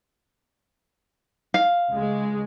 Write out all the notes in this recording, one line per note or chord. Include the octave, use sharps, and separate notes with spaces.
F5
C#2 G#3